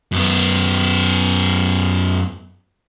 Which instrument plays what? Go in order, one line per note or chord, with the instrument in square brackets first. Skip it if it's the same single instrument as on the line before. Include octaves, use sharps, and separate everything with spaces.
[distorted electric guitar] F#2 B3